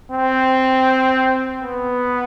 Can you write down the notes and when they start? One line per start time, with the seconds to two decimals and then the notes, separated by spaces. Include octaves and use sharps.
0.12 C4
1.63 B3